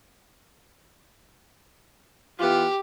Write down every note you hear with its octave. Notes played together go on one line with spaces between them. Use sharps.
E3 B3 F4 G4